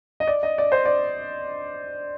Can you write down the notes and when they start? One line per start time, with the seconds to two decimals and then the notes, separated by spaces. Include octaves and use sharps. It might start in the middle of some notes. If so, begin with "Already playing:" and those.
0.20 D#5
0.27 D5
0.43 D#5
0.58 D5
0.72 C5
0.85 D5